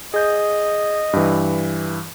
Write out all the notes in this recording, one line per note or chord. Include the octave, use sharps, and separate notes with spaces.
G#4 D#5 G6
G2 E3